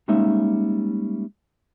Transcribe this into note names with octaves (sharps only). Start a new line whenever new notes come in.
G3 G#3 A#3 C#4 D#4 E5